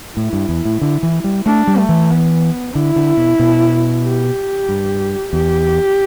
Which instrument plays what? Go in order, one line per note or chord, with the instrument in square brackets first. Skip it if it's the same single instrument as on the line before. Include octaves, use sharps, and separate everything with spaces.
[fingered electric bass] A2 [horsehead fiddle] E4
[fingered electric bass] G2
E2
A2
D3
E3
G3
[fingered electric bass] A3 [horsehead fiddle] D4
[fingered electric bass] G3
[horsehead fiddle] A3
[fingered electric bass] E3
[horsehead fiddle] B3
[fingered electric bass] D3 [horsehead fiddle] E4
[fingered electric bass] D3
B2
B2
[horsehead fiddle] G4
[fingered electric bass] G2
[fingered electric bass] E2 [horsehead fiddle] G4